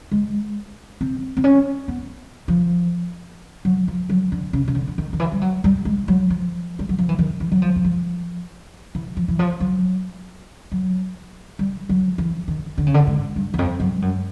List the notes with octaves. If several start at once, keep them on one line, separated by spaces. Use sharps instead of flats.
G#3
C4
C4
C#4
B3
F3
F#3
F3
F#3
D3
C#3
C#3
D3
D3
D#3
D#3
E3
G3
F#3
G3
G#3
F#3
F3
G3
F#3
F3
E3
D#3
E3
F#3
F3
E3
F3
E3
F3
E3
F3
F#3
F#3
G3
F#3
E3
D#3
D3
C#3
D3
G#2
G2
E2
F2
F#2
G2
F#2